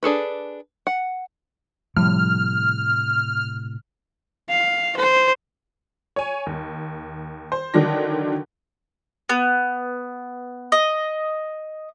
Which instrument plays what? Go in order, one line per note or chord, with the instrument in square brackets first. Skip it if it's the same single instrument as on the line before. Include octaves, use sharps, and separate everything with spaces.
[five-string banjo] D4 G#4 A4 B4
F#5
[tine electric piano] A2 C3 [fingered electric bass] F3 G3 [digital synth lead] F6
[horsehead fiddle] F5
C5
[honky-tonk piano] C#5 G#5
D#2
C5
D3 D#3 F#3 D4 A#6
[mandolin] B3
D#5